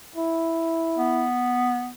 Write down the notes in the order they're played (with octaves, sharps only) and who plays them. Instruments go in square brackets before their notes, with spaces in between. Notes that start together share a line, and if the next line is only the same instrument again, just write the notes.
[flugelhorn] E4
[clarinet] B3